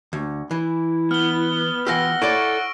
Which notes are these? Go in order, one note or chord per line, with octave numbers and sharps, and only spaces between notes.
D2
E3 E4
B3 F6 G7
E3 F4 G4 F#5 E6 A#6
E4 A4 C#5 D5 C#6 D7